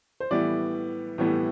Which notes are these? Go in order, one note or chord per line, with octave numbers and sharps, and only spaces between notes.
C5
A2 E3 G3 B3 D5
A2 E3 G3 B3